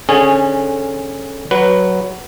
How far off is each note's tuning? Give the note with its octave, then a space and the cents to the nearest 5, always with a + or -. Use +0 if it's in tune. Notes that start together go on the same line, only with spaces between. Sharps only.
D3 +0 C#4 -20 G#4 +0
F#3 +10 B4 +0